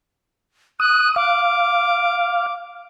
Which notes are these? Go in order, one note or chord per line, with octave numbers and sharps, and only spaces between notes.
D#6 F#6
F5 D6